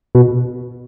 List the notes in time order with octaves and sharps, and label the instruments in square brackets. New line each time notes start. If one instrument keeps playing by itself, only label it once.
[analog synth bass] B2